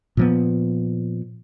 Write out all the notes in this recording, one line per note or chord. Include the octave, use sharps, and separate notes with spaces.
A#2 F3 B3